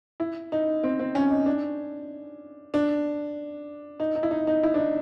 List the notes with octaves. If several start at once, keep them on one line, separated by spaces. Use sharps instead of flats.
E4
D#4
C4
C4
C#4
D#4
D4
D4
D#4
D#4
E4
D#4
D#4
E4
D4
D#4